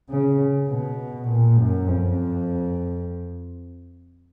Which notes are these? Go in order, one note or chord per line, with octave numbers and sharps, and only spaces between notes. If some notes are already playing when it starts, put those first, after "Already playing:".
C#3
B2
A#2
F#2
F2